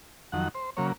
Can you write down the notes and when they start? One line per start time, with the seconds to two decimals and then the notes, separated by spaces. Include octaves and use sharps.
0.32 F2 D#3 F#3 F#5
0.55 C5
0.77 C#3 F#3 A#3 C#5